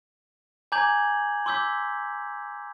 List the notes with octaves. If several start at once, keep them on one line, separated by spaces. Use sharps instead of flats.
G#5 A#5 D6 G6 G#6 F#7
C6 D6 E6 G6 B6